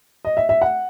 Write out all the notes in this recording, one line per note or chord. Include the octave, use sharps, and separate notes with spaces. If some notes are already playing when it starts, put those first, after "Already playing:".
D#5
E5
E5
F#5